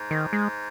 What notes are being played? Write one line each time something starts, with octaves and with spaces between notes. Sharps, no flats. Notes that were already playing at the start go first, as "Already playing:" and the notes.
Already playing: G#2
D#3
G#3